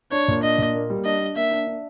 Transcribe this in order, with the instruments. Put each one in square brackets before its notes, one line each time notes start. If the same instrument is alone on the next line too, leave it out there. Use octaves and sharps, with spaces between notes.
[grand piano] D4 [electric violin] C#5
[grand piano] A#2
[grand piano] D4 [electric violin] D#5
[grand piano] A#2
A#3
G3
[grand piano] D4 [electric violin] D#5
[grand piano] D4
[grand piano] A#3 [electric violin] E5
[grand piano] D4
D4